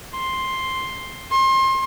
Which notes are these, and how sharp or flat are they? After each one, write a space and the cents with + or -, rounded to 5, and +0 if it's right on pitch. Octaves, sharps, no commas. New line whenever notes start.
C6 +5
C6 +30